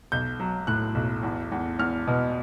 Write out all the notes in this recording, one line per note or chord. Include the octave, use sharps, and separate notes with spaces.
B1 G6
F#3
A2 F#6
B1
E2
E2
E2 F6
B2